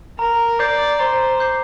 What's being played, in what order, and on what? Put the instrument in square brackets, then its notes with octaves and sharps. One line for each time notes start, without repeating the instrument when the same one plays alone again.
[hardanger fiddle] A#4 [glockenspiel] A#5
[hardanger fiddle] D5 [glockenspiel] D6 G6 C7
[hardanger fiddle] C5 [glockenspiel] A#5
[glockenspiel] D6 G6 C7